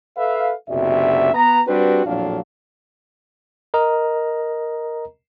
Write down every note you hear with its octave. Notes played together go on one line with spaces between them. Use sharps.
A4 B4 E5 F5
F#1 B1 C3 F#4 D5 E5
B3 A#5
G3 C4 D4 F#4 G4 B4
A#1 F2 A2 F#3 D4 F5
A#4 D#5 A#5